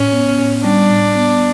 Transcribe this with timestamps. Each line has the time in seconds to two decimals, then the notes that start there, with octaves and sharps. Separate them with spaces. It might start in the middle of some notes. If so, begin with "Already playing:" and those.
Already playing: A2 C#4
0.12 B3
0.39 A2
0.64 G3 D4
0.90 A2
1.15 B3